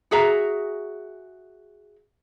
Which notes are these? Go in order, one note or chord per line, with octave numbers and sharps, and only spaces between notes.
F#4 G#4 E5 A#5